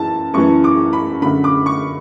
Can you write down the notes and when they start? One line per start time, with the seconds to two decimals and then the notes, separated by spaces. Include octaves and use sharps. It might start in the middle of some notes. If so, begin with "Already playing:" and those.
Already playing: F#2 E3 A5
0.34 F#2 E3 C#6
0.64 D6
0.93 B5
1.22 F#2 D3 B5
1.44 D6
1.66 C#6